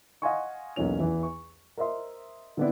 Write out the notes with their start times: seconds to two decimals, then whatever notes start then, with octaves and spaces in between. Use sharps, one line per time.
0.22 D#5 F5 F#5 G#5 C6 C#6
0.76 B1 E2 A#3 C#4 F7
1.00 E2 E3
1.23 C#6
1.77 A#4 C5 D#5 E5 C6
2.57 D3 F3 B3 C4 D4 E4